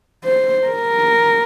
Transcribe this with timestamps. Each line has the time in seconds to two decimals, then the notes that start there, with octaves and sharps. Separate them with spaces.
0.24 C5
0.67 A#4